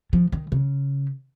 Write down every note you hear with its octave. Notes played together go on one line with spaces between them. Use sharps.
F3
D#3
C#3